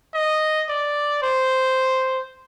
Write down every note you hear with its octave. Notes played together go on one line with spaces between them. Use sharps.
D#5
D5
C5